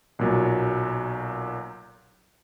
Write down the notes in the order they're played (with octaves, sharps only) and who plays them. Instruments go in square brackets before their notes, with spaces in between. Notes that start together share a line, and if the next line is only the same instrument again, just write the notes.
[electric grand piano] B1 A#2 F#3